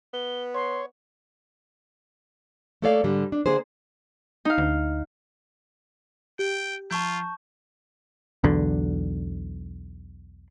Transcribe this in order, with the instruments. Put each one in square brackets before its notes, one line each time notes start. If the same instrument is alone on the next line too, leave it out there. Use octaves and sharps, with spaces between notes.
[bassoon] B3 [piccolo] G7
[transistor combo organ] C#5 [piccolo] C6
[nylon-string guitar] A3 A#3 A4 C#5 D5 F5
G#2 D3 G3
D4
D3 A#3 D4 G#4 C5
[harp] D#4 F5
[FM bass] D2
[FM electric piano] G4 [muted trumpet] G5
[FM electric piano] F3 A#5 [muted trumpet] F4 [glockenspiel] A5 C#6 G6
[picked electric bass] B1 E2 D3